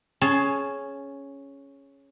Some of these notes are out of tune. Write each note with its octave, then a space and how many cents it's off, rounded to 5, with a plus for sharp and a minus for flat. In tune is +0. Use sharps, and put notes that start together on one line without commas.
C#4 +0 G#4 +15 A5 -10